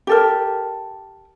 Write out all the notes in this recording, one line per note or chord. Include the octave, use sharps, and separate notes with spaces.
G4 A4 A#4